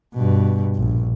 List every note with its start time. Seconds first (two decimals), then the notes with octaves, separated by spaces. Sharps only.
0.15 G2 B2
0.76 A#1